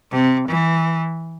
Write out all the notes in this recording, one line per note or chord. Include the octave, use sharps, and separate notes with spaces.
C3
E3